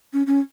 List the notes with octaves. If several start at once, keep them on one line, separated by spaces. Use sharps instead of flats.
C#4
C#4